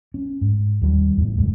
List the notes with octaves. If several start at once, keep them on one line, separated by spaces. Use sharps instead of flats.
C#4
G#2
D#2 G3
E2 A2
F#1 D#2 G#3